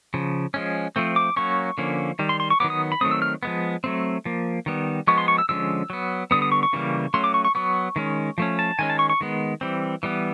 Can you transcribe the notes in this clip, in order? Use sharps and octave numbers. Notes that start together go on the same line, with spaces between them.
C#3 F3
F3 G#3 C#4
F3 A3 C4
D6
F#3 A#3 C#4 C#6
D3 F3 A#3 C#4
D#3 G3
C6
C6
C#6
D#3 F#3 B3 D6
D#6
B5
D#3 F#3 A3 C4 D#6
E6
F6
F3 G#3 B3
F#3 A3 C4
F3 A#3
D#3 G3 B3
F3 G#3 B3 C#6
C6
C#6
E6
D3 F3 G#3 C#4 E6
F#3 B3
D3 G3 B3 D#6
D#6
C#6
C#6
C#3 E3 G3 A#3
F#3 A3 C#4 C6
D6
C#6
C#6
F#3 B3 C#6
D#3 G#3 C#4
F3 A3 C#4
A5
D#3 G#3 C#4 G#5
A5
C#6
C#6
D#3 G#3 B3
E3 G3 C4
E3 G3 B3